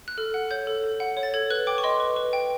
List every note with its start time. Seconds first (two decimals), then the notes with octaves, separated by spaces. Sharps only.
0.08 F#6
0.18 A4 F6
0.34 F#5 F#6
0.51 C#5 G6
0.67 A4
0.84 A4
1.00 F#5
1.17 C#5
1.23 A6
1.34 A4 G#6
1.50 B4 F#6
1.67 G5 D6
1.78 C#6
1.84 D#5 C6
2.00 B4
2.16 B4
2.33 G5